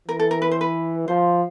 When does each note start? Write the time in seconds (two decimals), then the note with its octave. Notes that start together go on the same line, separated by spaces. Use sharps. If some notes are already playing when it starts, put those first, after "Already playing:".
0.08 E3 A#4
0.19 A4
0.31 A#4
0.42 B4
0.51 C5
0.61 B4
1.08 F3 C5